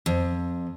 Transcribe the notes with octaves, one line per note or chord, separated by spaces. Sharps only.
F2